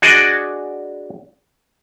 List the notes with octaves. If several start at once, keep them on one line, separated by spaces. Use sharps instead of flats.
D4 F#4 G#4 D5 D#5